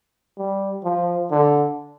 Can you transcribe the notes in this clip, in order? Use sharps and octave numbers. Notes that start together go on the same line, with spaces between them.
G3
F3
D3